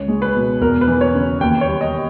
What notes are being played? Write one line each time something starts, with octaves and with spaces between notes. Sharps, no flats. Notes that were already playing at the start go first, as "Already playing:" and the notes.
Already playing: C#2 C#5
G#3
B4
B2
E2 A#4
B4
E3
C#5
C#3
D#2 G5
C#5
G3
D#5